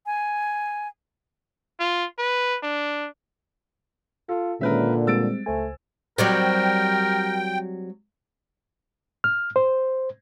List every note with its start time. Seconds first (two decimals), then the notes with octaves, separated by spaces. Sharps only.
0.06 G#5
1.80 F4
2.18 B4
2.63 D4
4.29 F4 A4
4.61 A#2 D3 D#3 G#3 C#4 A#4 B4 E5
5.07 G3 G#3 C4 E6 A6 D7
5.46 C#2 A3 C5 G#5
6.18 F#3 G3 C4 A#4 G5
9.24 F6
9.56 C5